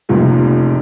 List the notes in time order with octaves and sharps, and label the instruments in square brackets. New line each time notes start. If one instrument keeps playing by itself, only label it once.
[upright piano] F1 C#2 A2 F3 A#3